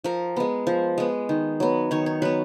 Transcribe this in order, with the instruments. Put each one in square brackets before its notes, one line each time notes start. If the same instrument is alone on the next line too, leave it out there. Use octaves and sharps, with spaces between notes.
[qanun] F3 A#4
G#3 B3
F3
G#3 B3
D#3
F#3 B3
D#3 C#5
C#5
F#3 B3 B4